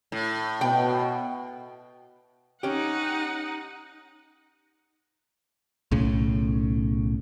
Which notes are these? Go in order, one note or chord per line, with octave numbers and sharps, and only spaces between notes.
A2
B2 G5
C#4 D#4 G4 F#5
B1 A2 C#3